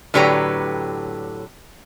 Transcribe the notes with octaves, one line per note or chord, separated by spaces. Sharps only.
A2 D3 F#3 G4 B4 A#5